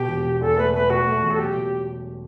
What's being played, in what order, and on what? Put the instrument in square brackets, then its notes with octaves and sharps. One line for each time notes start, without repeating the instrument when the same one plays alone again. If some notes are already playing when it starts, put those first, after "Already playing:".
Already playing: [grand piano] B2 [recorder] G4
[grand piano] E1
B2
[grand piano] E2 [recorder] A4
[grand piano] A3 [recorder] B4
[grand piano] A3 [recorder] B4
[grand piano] B2 [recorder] F#4
[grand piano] A3
E1
[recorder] A4
[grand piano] F#3 [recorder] G4
[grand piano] B2